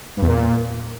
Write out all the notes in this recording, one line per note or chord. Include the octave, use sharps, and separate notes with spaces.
G2
E2
A#2